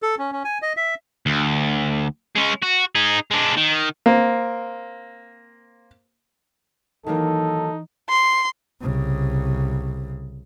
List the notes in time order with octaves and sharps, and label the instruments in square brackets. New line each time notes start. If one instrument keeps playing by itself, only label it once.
[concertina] A4
C#4
C#4
G#5
D#5
E5
[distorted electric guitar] D2
G#3 C#4
F#4
D#4 G#4
G#3 D4
D#3
[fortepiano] A#3 C4
[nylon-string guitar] D#3 F#3 A#3 [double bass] E3 [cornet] D#4 [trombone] A4
[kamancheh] C6
[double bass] C2 C#3